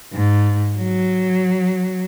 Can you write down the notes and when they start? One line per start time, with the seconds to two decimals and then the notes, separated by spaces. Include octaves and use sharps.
0.13 G#2
0.76 F#3